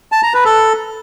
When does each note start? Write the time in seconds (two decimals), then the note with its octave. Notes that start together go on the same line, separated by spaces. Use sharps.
0.12 A5
0.23 A#5
0.34 B4
0.45 A4